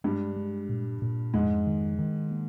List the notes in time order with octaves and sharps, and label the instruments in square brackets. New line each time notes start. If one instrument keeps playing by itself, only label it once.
[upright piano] G2 G3 [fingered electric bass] G#3
[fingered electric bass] G#3
A#2
A#2
[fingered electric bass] F2 [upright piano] G#2 G#3
[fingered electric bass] D#3
D#3
A#3